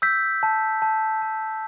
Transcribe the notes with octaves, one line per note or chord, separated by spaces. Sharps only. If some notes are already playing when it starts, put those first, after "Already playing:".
E6 G6 B6
A5
A5
A5